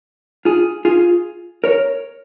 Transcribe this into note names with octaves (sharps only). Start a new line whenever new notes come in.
F4 G#4
F4 G#4
A#4 C#5